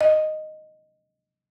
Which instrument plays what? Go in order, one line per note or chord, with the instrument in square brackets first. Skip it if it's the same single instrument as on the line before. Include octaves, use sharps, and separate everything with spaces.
[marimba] D#5